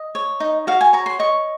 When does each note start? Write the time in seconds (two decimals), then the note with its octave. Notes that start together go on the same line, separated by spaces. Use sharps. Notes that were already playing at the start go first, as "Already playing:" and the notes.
Already playing: D#5
0.15 C#5
0.40 D#4
0.67 F#4 F5
0.81 G#5
0.93 C#5 A#5
1.06 C6
1.19 D#5 C#6